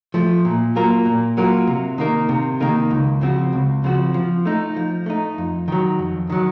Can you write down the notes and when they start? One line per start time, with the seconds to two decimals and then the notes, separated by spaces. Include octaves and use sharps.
0.14 F3 A3
0.45 A#2
0.76 F#3 A#3 F4 A#4
1.05 A#2
1.37 F#3 A#3 F4 A#4
1.67 C3
1.98 D#3 A#3 D#4 A#4
2.29 C3
2.60 D#3 A#3 D#4 A#4
2.90 C#2
3.21 C#3 F3 C4 F#4
3.53 C#2
3.84 C#3 F3 C4 F#4
4.14 F3
4.45 A3 D#4
4.76 F3
5.06 A3 D#4
5.38 F2
5.68 D#3 F#3
5.99 F2
6.30 D#3 F#3